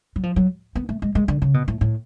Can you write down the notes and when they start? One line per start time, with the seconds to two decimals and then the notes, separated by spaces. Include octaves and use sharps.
0.16 F#3
0.23 F3
0.36 F#3
0.75 B3
0.89 A3
1.02 G#3
1.15 G#3
1.28 D3
1.42 C#3
1.54 B2
1.68 A2
1.81 A2